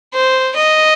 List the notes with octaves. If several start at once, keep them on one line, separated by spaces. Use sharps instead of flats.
C5
D#5